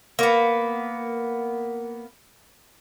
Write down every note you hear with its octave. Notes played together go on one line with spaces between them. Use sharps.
A#3 B3